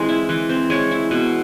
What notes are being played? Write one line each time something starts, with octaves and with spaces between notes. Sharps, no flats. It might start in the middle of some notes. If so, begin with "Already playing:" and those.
Already playing: E3 G#3 C4
E4
E3
C4
G#3 C#5
E4
B2